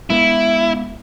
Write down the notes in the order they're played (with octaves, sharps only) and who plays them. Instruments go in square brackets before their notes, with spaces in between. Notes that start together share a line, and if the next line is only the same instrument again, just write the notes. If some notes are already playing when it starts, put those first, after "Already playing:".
[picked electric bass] G#3 A3 B3 [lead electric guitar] E4